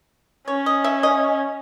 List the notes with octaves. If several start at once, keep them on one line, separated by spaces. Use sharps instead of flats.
C#4 C#5
D#5
E5
D#5